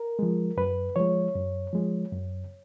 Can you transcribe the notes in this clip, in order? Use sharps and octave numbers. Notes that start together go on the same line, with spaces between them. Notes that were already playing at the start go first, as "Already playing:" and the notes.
Already playing: A#4
F3 G#3
F#2 B4
F3 G#3 C#5
F#2
F3 G#3
F#2